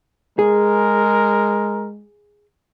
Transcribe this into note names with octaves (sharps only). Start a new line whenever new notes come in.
G#3 G#4 A#4